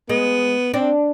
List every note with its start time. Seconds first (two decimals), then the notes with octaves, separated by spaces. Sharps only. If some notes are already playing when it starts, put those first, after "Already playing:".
0.09 G#3 B3
0.74 C4 D4